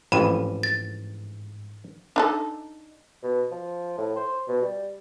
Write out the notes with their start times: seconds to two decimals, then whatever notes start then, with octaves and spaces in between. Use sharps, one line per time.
0.12 A1 F2 G#2 B5 D#7
0.63 A6
2.16 D4 D#4 A4
3.23 B2
3.51 F3
3.98 A2
4.16 C5
4.48 B2
4.62 G3